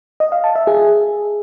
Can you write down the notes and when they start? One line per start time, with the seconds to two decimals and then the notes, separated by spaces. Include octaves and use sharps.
0.20 D#5
0.32 F5
0.44 A5
0.56 E5
0.67 G#4